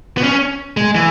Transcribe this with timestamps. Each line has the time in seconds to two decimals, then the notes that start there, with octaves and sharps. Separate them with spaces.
0.17 B3
0.23 C#4
0.77 G#3
0.95 E3